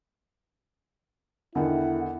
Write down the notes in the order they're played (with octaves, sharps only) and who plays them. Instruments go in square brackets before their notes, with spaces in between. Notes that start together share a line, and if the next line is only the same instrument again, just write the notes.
[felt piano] E2 D3 D#3 [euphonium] E4 [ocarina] F#5